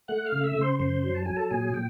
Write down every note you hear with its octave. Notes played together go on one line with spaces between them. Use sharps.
A3 F#5 F#6
F5 F6
C#3
E5 E6
C#3
C5 C6
F#2 C5 C6
F#3
A5
F#3 G#5
A4 A5
A#2 G#4 G#5
A#2 G5